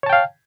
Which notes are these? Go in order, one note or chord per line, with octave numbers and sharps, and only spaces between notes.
C#5 F5 G5 A5